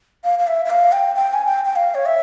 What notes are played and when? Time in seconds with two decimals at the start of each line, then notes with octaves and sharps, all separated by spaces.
0.24 F5
0.39 F5
0.47 E5
0.65 E5
0.70 F5
0.92 G5
1.15 G5
1.33 G#5
1.46 G5
1.65 G5
1.76 F5
1.95 C#5
2.06 E5